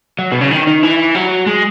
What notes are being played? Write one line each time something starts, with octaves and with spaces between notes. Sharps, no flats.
F#3
B2
C#3
D#3
D#3
E3
F#3
G#3